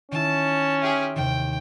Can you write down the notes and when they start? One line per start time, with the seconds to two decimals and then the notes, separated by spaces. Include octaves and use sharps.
0.12 D#3 C#4 E4 A5
0.82 G4 G#4 E5 C6 F6
1.15 D#2 C3 D#3 G5